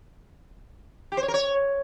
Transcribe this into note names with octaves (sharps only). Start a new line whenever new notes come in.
G4
C5
C#5
A#4
C#5